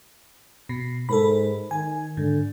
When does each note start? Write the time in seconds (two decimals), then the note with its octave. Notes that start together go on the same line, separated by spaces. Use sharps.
0.69 B2
1.09 G#2 A4 A#4 B5
1.71 D#3 G#5
2.17 G#2 D3